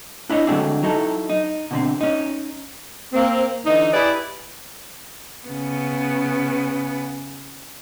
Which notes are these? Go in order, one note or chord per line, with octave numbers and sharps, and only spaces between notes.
D4 E4 C#5 D#5
D3 F#3 G#3 A3 C4 D4
F#3 D#4 E4 A4
D#4
B2 D3 C4
C#4 D#4
A#3 C4
D3 E3 D#4
E4 G4 G#4 B4 D5
C#3 B3